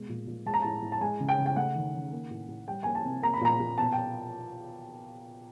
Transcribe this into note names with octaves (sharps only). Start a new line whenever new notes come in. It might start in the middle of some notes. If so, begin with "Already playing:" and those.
Already playing: B2 G#3
A#2
A#2
G#3 A5
A#5
A2 A5
A2
A5
G#3 G#5
C#3
G5
C#3
G5
A3 F#5
D#3
D#3
A#3
A2
A2
G3 G5
A#3 G#5
A5
C3
A#3 A#5
B5
A#2 A#5
A#2
B2 A5
G5